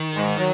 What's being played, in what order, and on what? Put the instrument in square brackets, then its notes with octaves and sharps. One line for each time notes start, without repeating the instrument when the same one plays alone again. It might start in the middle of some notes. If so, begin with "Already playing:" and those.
Already playing: [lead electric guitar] D#3
[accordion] G#2
F#3